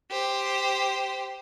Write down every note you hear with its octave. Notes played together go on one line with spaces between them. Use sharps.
G4 C5